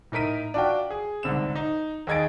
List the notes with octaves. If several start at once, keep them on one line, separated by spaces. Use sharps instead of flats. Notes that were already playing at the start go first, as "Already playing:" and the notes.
A2 D#4 A#4 B6 D#7
D4 F4 F#4 G5
G#4
C2 G#2 D3 C4 E7
D#4
D#2 G#4 D#5 G#6 A6 D7